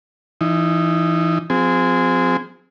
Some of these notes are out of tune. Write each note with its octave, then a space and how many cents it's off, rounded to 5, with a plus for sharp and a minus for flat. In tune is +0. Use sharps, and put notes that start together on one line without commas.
E3 +25 D#4 +0
F3 +30 C4 -25 G#4 -5